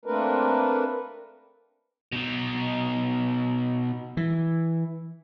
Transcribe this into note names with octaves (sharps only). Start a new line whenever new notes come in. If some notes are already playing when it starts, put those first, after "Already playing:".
A3 A#3 C4 D4 A#4 B4
B2 D#4
E3